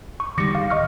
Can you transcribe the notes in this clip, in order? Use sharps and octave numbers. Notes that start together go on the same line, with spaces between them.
C#6
D3 D#3 G3 D6 A#6 C#7
F5
D1 D#5 C#6 F6